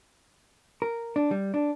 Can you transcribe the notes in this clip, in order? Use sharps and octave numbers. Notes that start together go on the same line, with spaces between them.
A#4
D4
G3
D4